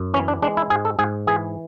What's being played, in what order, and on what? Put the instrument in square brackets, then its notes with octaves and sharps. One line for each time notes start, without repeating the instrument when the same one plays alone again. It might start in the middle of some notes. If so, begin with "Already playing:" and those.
Already playing: [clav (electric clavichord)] F#2
E3 C#4
D4
G#3 D4
E4
G#2 G#4
A4
G#2 G#4
E3 G#4